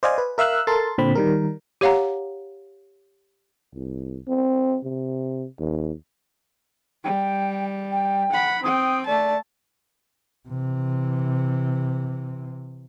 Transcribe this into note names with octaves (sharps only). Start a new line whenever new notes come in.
C5 D5 D#5 F5 G#5
B4
A#4 E5 F5 E6 F#6
A4 A#4 C6 A6
A#2 D3 C4 B5
D#3 G3 A#4
G4 C#5 F5 F#5 A#5
C2
C4
C3
D#2
G3 G5
G5
F#5 B5
C4 G5 D#6
A3 D5 A5
C3 E3